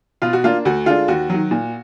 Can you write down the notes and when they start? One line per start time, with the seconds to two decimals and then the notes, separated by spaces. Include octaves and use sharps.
0.22 B2 F4
0.33 F#4
0.44 A#3 D4 F4
0.65 D2 F#4
0.86 D3 G#3 D4 F4
1.08 D#2 F#4
1.30 D#3 F#3
1.51 A#2